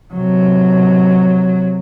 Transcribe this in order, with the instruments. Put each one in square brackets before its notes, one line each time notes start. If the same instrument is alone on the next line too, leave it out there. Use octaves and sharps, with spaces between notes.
[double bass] C3 F#3